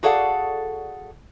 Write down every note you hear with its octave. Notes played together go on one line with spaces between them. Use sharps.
F#4 G#4 A4 D5 F5 F#5